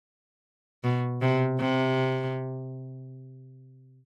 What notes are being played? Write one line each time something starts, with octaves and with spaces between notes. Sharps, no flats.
B2
C3
C3